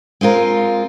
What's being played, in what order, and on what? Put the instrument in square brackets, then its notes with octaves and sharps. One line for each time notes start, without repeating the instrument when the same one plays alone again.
[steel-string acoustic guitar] G#3 C4 F4 A#4